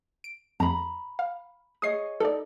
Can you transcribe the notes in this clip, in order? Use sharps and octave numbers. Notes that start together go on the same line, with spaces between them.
D7
F2 A#5 B5
F5
G#4 C#5 D#5 D#6 C7
D#4 A4 D5